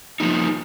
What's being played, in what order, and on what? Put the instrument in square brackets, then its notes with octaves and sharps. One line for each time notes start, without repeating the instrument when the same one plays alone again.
[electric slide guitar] F3 A#3 D#4